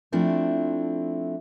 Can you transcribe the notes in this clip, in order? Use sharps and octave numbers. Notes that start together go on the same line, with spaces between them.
F3 A3 C4 D4 E4